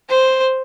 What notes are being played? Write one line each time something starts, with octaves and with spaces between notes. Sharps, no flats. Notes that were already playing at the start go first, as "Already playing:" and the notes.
C5